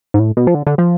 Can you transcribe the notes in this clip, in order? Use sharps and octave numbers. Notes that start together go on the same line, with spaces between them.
G#2
A2
B2
F3
D3
D3
F3